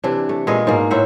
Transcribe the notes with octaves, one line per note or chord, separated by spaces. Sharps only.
C3 E3 D4
A3
A#2 G#3 B3 D#5
G#2 B2 A#3
A2 C5 E5 F#5